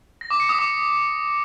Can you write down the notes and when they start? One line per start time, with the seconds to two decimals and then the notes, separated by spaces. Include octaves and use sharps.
0.21 A#6
0.31 D6
0.40 C#7
0.49 D#6
0.59 D6